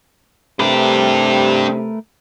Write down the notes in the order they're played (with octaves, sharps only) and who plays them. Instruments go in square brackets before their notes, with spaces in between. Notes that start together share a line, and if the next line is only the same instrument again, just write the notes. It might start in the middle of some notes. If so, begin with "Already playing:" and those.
[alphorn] C3 [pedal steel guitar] A3 A#4 B4 [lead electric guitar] D4 G4